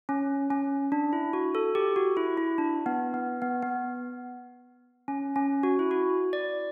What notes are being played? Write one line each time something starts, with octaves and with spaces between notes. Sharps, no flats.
C#4
C#4
D4
E4
F#4
A4
G4
F#4
E4
E4
D4
B3
B3
B3
B3
C#4
C#4
F#4
E4
F#4
D5